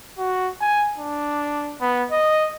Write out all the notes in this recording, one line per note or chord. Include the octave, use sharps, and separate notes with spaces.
F#4
G#5
D4
B3
D#5